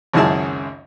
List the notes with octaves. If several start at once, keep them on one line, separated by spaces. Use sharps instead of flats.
G#1 C#2 F#2 E4 G#4 A5